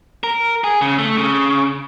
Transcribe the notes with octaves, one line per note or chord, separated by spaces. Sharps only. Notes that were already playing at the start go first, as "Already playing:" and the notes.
A#4
G#4
C#3
A3
C#3